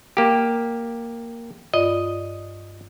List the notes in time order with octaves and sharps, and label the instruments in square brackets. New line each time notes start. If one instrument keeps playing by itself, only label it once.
[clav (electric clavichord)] A#3 G4
[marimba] G2 F4 D5 [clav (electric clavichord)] D#5